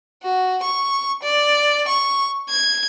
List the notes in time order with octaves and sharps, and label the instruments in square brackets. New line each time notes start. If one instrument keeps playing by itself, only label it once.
[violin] F#4
C#6
D5
C#6
G#6